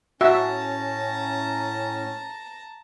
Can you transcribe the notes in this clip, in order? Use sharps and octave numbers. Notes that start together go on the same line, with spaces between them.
A2 C#4 F#4 E5 A5 A#5